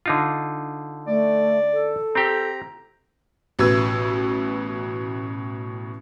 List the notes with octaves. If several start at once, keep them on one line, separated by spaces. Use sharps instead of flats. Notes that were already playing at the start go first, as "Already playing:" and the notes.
D3 D#4 F4
A3 D5
A4
C4 G4 A#5
A1 B2 B4 E6 G#6